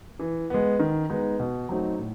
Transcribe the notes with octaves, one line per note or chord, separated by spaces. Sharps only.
E3
G#3 B3
D#3
G#3 B3 D#4
B2
F#3 A3 C4 D#4
A2